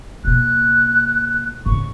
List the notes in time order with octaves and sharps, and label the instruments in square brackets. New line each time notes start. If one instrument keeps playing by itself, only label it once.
[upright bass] B2 A#3 [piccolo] F#6
[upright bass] G#2 C#3 [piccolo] C#6